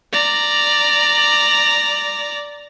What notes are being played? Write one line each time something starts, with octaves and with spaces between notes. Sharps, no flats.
D5 A#5